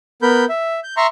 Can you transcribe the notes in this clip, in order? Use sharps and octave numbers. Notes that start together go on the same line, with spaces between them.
B3 A#4 B5 G6
E5
G6
E5 A#5 C6 C#6